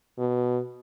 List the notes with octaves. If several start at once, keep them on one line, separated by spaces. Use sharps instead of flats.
B2